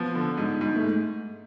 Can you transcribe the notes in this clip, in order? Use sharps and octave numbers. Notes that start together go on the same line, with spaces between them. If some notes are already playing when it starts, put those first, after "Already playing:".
Already playing: F3 B3
D3
G#2
G#2
A3